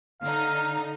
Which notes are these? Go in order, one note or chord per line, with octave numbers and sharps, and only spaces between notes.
D3 D#4 F5